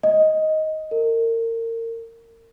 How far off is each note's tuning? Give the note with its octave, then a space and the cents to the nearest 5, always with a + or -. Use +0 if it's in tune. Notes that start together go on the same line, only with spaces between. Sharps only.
D#5 +10
A#4 -30